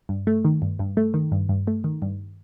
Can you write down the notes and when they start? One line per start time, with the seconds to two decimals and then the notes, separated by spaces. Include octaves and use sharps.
0.09 G2
0.27 A3
0.45 D#3
0.62 G2
0.79 G2
0.97 A3
1.14 D#3
1.32 G2
1.49 G2
1.67 A3
1.84 D#3
2.02 G2